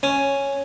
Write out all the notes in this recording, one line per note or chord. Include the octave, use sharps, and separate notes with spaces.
C#4